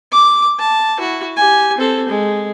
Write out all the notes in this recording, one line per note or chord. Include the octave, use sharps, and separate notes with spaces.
D6
A5
E4 F#4
G4 G#5
C4 A4
G#3